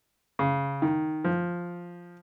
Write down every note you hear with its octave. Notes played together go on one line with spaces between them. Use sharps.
C#3
D#3
F3